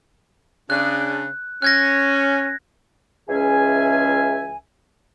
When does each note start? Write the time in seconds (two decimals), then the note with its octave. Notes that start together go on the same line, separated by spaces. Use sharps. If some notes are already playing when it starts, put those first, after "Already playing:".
0.70 C#3 D4 F#6
1.62 C#4 F#6 G#6 A#6
3.29 C#2 E3 C#4 G#4 E5 G#5